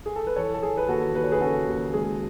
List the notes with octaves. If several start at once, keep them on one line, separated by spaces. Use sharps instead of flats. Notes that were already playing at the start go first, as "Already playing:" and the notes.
G#4
A4
B4
E3 A4 C#5
A4
E3 G#4
B4
D#2 F#4 A4
D#2 B4
C#5
G#4 B4
C#3 F#4 A4
D#2
G#3 G#4